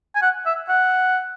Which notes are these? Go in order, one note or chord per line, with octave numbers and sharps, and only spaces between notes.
G#5
F#5
E5
F#5